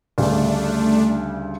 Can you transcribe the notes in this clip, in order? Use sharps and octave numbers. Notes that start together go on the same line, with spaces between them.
D2 C#3 G3 A3 D4